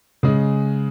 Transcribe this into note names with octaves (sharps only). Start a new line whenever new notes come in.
C#3 G#3